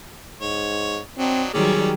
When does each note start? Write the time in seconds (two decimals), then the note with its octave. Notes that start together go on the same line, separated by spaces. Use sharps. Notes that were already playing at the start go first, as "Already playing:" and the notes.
0.41 G#2 C#5
1.18 F#3 C4 D4 D#4
1.54 D#3 F#3 G3 C4 C#4 G#4 D5